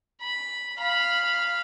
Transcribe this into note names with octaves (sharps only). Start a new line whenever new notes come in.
B5
F5 B5